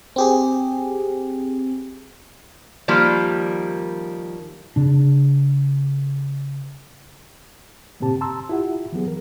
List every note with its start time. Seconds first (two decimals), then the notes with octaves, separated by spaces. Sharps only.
0.16 C4 G4 G#4
2.88 D#3 F3 G3 A#3
4.76 C#3 D4
8.00 G2 A#2 C#3 C4 G4 A5
8.21 A5 A#5 C6 E6
8.49 E4 F4 G4 E5 F#5
8.92 E3 F#3 B3 G#4
9.08 A#4